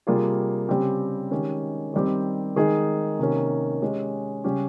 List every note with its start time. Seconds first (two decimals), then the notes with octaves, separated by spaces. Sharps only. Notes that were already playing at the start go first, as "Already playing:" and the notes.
0.07 C3 G3 A#3 F4 G#4
0.69 C#3 G3 C4 G4
1.31 D#3 G#3 C#4 G4
1.94 D#3 G3 C4 G4
2.56 D#3 G#3 D#4 G#4
3.19 C3 D#3 A#3 C#4
3.82 G#3 C#4 G4
4.44 C#3 G3 C#4 G4